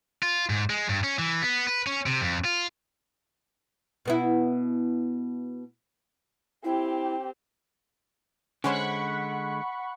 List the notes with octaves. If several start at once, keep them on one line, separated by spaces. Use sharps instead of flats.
F4
G#2
G#3
G2
C#4
E3
B3
B4
C#4
C3
F2
F4
B2 B3 E4
C4 E4 G4
D3 G#3 C#4 C5 C#5 F#5 B5 C#6